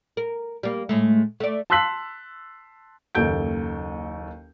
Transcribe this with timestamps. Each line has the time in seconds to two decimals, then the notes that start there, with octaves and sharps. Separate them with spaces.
0.17 A#4
0.63 G3 A#3
0.89 A2 G#3 A3
1.40 A3 D5
1.70 A5 C6 E6 F#6 B6 F#7
3.15 F#1 D#2 A4 G6 D7